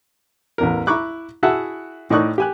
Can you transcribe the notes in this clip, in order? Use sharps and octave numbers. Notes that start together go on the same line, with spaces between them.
A1 E2 A#4
E4 A#5 B5 C#6 D6 F#6
E4 F#4 G#4 E5 F#5 A5
A2 D#4 D5 C#6 D#6 F#6
G4 G#5 F#6